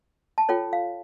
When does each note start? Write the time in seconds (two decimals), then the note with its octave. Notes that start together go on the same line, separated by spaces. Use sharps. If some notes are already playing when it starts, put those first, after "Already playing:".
0.38 A5
0.49 F4 A4 C#5 G5
0.73 F5